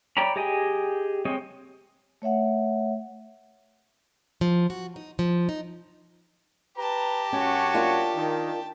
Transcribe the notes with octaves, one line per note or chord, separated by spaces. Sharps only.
C#5 D5 G5 A#5 B5
G4 G#4 D#5 G5 G#5
G#3 C4 C#5 D#5
A3 C#5 E5 F#5
F3
F#4
D#4
F3
D#4
G4 B4 A5 A#5
F#2 C#4 F#4 C#5
A#3 D4 F4
D#3